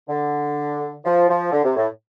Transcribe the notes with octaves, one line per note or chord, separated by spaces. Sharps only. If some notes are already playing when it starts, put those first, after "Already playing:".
D3
F3
F3
D3
C3
A2